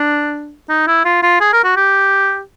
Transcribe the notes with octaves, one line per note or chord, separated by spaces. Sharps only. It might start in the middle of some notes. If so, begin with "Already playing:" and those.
Already playing: D4
D#4
E4
F4
F4
G#4
A#4
F#4
G4